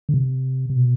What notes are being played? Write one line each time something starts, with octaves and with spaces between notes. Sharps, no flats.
D3
C3
C3
B2